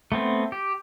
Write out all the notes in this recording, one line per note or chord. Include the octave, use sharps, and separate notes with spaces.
A3 B3 C4
G4